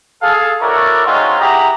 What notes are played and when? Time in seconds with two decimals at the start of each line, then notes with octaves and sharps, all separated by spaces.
0.22 G#4 A4 F5
0.60 E4 F#4 A4 A#4 C#5 D5
1.06 G#3 C4 C#4 D#4 F4 F#4
1.39 E4 G4 G#4 F#5 A#5